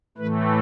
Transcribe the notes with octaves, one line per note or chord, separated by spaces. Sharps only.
A2 E3 A3 B4